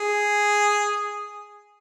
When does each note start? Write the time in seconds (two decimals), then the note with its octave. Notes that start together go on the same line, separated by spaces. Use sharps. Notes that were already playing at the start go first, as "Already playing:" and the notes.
Already playing: G#4